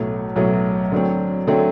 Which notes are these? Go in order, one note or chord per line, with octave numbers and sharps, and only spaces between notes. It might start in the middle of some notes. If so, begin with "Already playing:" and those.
Already playing: B1 A2 F#3 A3
B1 A2 F#3 A3
D3 F#3 A3 C4
D3 F#3 A3 C4